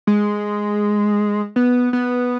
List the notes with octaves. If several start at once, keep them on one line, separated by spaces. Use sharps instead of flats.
G#3
B3
B3